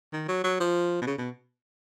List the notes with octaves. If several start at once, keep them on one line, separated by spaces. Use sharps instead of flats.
D#3
F#3
F#3
F3
B2
C#3
B2